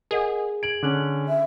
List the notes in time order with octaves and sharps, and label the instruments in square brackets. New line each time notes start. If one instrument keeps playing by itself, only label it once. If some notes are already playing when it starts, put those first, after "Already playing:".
[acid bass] G#4 [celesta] A#4 D#5 F#5
[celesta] G#6 F#7 [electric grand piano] D7
[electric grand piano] D3 C#4 [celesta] D6 F#6 F#7
[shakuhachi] E5